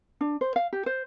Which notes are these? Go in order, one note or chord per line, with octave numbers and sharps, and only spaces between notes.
D4
C5
F5
G4
C5